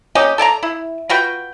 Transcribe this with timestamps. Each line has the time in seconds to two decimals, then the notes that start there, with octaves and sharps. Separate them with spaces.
0.15 A#3 C#4 G4 D#5
0.38 A4 D5 G#5 A#5
0.63 E4
1.09 F4 F#4 B4 G5